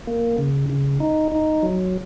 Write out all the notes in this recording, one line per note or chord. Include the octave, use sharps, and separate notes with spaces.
A#3
C#3
C#3
D#4
D#4
F#3